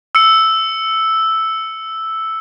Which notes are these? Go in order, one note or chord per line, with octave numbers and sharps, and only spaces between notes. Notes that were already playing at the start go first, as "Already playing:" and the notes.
E6 C#7